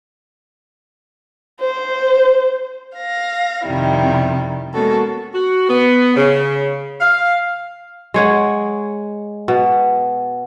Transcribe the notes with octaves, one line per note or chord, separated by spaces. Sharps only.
C5
F5 A#6
F2 C3 D#3 G3 E4
G#3 A#3 B3 C#4 F#4 A4
F#4
B3
C#3
F5
G#3 C#5 F#5
B2